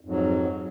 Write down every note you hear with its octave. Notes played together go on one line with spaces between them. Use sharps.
F2 G#2 F#3